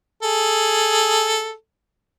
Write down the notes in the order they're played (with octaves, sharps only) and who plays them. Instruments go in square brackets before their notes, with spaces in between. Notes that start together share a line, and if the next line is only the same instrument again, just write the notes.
[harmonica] G#4 A4